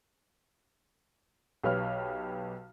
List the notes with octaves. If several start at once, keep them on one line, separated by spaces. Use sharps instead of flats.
B1 G4 B4 C#5 F6